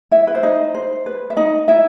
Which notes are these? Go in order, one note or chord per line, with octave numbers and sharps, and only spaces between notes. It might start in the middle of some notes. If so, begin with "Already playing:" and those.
E4 E5
B4
C5
D#4 D#5
C5
B4
E5
D#4 D#5
E4 E5